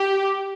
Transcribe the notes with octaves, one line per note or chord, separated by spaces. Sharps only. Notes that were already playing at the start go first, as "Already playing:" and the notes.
Already playing: G4